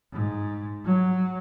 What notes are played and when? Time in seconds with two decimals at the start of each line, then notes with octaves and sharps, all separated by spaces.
0.13 G#2
0.85 F#3